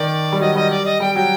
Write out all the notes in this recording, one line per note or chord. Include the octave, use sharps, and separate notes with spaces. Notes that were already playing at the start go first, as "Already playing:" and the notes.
Already playing: D#3 D5
G3
F#3 D#5
G3 D#5
D5
D#5
G3 G5
F#3 G5